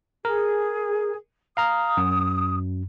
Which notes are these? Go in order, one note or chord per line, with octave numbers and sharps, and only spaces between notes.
G#4 A#4
F5 A#5 D#6 F6
F#2